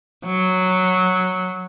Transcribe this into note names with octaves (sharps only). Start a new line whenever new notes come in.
F#3